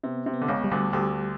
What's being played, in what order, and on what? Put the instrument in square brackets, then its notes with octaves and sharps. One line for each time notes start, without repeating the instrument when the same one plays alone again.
[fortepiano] C3 [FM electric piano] B3
[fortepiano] C3
[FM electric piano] B3
[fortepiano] D3
C#2 C#3
[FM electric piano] G3
[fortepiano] D2 D3
[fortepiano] D2 D3 [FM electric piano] G4